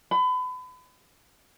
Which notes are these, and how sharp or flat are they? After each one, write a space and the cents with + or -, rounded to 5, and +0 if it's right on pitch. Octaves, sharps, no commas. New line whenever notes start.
B5 +35